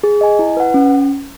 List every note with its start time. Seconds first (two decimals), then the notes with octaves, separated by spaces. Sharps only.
0.03 G#4
0.21 D#5 G#5
0.39 E4
0.57 B4 F#5
0.74 C#4